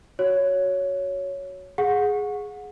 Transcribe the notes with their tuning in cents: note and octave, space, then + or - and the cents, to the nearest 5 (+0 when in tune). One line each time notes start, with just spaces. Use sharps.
F#4 +0 C#5 +5
G#4 +0 F#5 -25